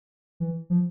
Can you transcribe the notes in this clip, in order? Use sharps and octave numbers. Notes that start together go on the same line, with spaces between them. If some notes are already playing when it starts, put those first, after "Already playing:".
E3
F3